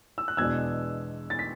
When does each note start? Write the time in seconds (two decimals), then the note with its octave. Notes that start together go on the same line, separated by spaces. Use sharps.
0.18 E6
0.28 F#6
0.37 E2 B2 G#3 D4 E6 G#6
1.30 A6
1.39 B6